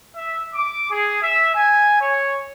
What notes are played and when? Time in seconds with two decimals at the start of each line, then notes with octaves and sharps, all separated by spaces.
0.16 E5
0.54 D6
0.91 G#4
1.22 E5
1.54 G#5
2.01 C#5